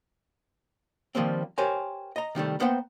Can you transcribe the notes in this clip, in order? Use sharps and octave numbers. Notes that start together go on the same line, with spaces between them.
D#3 F3 G3 A#3 C4
G4 A#4 C5 C#5 G#5
D#5 A#5
C3 D#3 G3 A3
A#3 B3 C5 F#5 G5